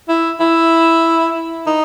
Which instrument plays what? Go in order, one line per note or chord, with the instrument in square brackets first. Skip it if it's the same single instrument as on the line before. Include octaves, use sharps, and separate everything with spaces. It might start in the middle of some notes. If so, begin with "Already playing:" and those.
[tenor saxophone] E4
E4
D#4